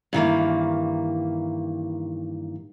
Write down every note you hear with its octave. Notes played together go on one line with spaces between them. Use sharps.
G2 D#3 E3 A#3